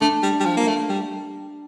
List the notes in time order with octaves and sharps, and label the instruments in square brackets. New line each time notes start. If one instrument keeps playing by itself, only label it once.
[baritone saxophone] A3 [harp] D4
[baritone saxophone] G3
G3
F3
A#3
A3
G3